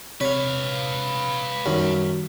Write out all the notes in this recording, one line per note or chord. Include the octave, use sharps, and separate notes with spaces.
C3 B4 C#5 F5
F#2 D#3 G3